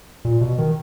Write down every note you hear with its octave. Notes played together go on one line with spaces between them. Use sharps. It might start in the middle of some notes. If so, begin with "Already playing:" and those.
A#2
B2
D#3